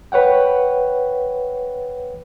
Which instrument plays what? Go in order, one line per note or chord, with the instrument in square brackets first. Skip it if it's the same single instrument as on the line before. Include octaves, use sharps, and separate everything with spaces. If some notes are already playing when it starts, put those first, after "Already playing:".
[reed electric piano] B4 C#5 F#5 G5